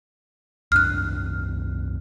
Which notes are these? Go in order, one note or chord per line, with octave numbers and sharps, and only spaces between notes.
C2 F#2 D4 F6 F#6